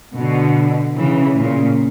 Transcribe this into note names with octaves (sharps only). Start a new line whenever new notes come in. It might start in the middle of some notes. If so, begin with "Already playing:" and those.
B2 D3
C#3 E3
A#2 C#3